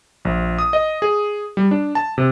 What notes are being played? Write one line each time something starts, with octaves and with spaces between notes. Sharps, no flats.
A#1
D#6
D#5
G#4
G3
D4
A5
C3